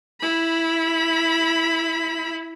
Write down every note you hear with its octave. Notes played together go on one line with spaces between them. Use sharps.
E4 B5